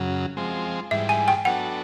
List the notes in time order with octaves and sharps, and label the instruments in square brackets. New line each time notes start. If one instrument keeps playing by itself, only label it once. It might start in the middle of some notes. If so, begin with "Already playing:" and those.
Already playing: [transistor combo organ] F#2 C#3 F#3
F3 G#3 C4
[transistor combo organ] G#2 E3 G3 [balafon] E5
[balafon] G#5
G5
[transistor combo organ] F#3 B3 D4 F#4 A4 [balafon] F#5